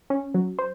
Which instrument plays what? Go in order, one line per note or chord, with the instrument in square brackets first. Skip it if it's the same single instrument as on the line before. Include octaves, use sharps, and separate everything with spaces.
[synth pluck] C#4
F#3
C5